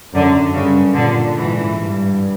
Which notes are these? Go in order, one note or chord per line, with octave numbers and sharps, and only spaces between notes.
F#2 D3
G2 C#3
A#2 D3
G#2 E3
G2